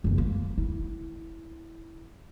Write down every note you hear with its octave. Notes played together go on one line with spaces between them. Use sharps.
F#1 E2
A#3
E4